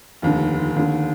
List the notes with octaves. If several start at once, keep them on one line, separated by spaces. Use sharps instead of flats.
F1 D#2 D3
D#2 D3